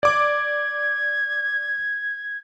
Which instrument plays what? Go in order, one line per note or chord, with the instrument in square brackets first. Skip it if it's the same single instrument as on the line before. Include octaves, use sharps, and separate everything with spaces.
[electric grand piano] D5 D6 [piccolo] G#6